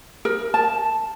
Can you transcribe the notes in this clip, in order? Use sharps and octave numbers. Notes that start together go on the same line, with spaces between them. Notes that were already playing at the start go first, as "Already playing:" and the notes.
A#4
A5